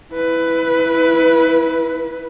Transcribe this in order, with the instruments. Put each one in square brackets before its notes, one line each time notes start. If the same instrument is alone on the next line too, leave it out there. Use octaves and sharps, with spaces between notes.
[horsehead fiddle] E4 B4